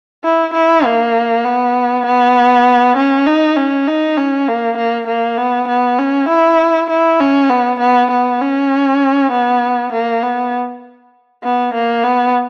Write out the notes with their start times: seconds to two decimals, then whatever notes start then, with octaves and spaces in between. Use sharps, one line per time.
0.24 E4
0.54 E4
0.84 A#3
1.44 B3
2.06 B3
2.97 C#4
3.27 D#4
3.57 C#4
3.87 D#4
4.16 C#4
4.48 A#3
4.77 A#3
5.07 A#3
5.38 B3
5.68 B3
5.98 C#4
6.29 E4
6.90 E4
7.20 C#4
7.49 B3
7.80 B3
8.11 B3
8.41 C#4
9.32 B3
9.92 A#3
10.23 B3
11.44 B3
11.74 A#3
12.03 B3